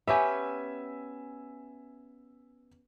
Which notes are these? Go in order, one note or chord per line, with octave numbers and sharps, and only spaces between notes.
B3 C#4 G4 E5 G#5